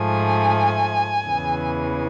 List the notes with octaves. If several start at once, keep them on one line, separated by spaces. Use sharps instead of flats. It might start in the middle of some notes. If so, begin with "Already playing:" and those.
Already playing: G#2 F3 A3 G#5
E2 C#3 E3